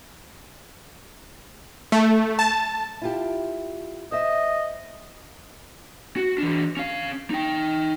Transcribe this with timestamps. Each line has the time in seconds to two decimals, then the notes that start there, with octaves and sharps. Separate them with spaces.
1.92 A3
2.39 A5
3.02 E4 F4 G4
4.12 C5 D#5 E5
6.16 F#4
6.38 E3 D4
6.77 C#4 F5
7.30 D#4 G5